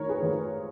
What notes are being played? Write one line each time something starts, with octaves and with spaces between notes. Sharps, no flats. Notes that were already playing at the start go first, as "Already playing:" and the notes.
Already playing: G#1 D#3 A#4 C#5
G#4 B4
G#1